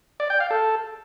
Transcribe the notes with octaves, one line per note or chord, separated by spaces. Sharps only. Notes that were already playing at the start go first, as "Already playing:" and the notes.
D5
G5
F5
A4